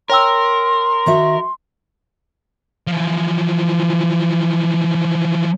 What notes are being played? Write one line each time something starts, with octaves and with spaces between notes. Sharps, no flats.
A#4 C#5 G5 C6 E6
D#3 F#4 E5
E3 F3